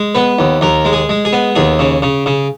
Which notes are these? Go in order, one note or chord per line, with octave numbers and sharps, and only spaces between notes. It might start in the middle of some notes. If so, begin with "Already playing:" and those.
Already playing: G#3
B3 B4
D#2
D#2 A#4
G#3
G#4
G#3
G#4
B3
D#2 G#4
C#3
C#3
C#3